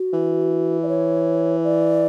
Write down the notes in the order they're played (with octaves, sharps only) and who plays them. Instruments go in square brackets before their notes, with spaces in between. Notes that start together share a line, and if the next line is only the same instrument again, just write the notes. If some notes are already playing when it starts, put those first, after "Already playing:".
Already playing: [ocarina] F#4
[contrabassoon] E3
[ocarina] D5
C#5
D5